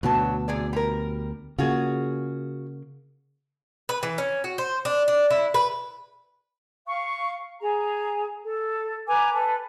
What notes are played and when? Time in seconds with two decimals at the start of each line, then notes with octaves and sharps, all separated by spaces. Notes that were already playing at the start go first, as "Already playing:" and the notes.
0.03 D2 G2 B2 F#3 B3 A5
0.48 C3 G#4 D5
0.73 G3 A#4
1.58 C#3 A#3 F4 F#4 G#4
3.89 B4
4.03 E3
4.18 C#4
4.44 F#4
4.58 C5
4.85 D4
5.08 D4
5.30 E4
5.54 B4
6.87 F5 C#6
7.61 G#4 A#5
8.44 A4
9.07 B4 G#5 A#5 D6
9.33 A4 B4